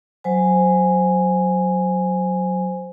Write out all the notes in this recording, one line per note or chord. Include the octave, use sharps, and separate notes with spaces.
F#3 C5 G#5